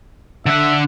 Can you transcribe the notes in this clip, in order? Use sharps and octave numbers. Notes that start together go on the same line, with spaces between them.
D3 E5 F#5